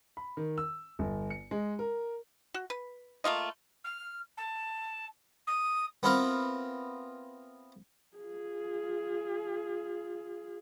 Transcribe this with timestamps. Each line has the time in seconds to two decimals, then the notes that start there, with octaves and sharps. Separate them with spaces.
0.17 B5
0.37 D#3
0.58 E6
0.99 G1
1.30 C#7
1.51 G#3
1.79 A#4
2.54 F#4
2.70 B4
3.24 A3 A#3 F4 D#5
3.84 F6
4.37 A5
5.47 D#6
6.03 B3 C4 E4 F4 A#4
8.17 F4 G#4